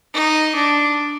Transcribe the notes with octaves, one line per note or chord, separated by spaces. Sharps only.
D#4
D4